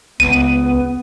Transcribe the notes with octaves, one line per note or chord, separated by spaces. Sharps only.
C#2 B3 D#7